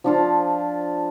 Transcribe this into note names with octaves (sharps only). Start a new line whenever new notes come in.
F3 D4 F4